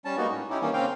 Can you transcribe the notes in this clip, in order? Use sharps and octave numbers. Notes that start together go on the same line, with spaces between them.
G3 C#4 A5
G3 G#3 A#3 B3 D#4 F#4
A2 C#4
C#4 D#4 E4 G4
D#3 E3 G3 A#3 C#4
C#3 A#3 C4 C#4 F5 G5